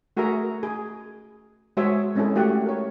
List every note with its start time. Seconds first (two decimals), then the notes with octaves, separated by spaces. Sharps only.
0.17 A3 F#4 G#4 A#4 E5 A#5
0.63 G#4
1.77 G#3 F#4 G#4 C5 C#5 E5
2.15 G#3 C4 C#4 E4 G#4 A4
2.36 A3 F#4 G4 F#5
2.66 A#4 C#5